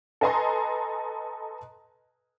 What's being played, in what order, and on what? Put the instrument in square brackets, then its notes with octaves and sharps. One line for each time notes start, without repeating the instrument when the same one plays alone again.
[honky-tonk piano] A4 B4 D#5 G#5 A#5 C6